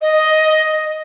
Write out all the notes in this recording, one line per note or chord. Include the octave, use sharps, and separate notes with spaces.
D#5